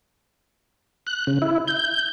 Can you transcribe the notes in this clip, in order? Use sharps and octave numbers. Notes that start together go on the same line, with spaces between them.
F#6
C#3
E4
G6